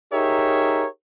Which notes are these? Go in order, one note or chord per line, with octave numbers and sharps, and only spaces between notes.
D#4 G4 G#4 A#4 C#5 E5